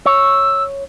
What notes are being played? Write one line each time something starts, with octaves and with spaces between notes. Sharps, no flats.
C#5 E6